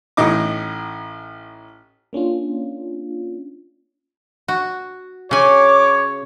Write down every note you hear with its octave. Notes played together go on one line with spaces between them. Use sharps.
A1 A2 D#4 D#5 D6
A#3 C#4 D4 F4
F#4
C#3 C#5 G#5 D6